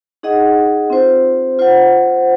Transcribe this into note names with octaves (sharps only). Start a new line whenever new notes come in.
D#4 G#4 D#5 F#5
C4 F4 C5
F4 C5 F#5